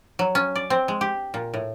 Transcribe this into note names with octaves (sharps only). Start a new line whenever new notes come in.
F#3
C#4
D5
C4
G#3
G4
A#2
A2